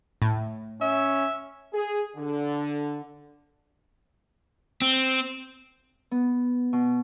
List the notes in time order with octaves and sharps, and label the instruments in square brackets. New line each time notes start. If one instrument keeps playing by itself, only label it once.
[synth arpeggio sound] A2
[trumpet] C#4 [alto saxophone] E5
[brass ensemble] G#4
D3
[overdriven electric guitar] C4
[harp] B3
B2